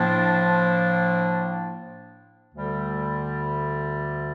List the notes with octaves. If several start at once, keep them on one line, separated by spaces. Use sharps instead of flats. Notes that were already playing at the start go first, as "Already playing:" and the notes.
Already playing: A2 F3 A#3 D4
D2 D3 G3